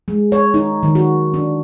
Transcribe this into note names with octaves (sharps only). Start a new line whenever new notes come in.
G#3
C#5
D#4
D#3
F#4
D4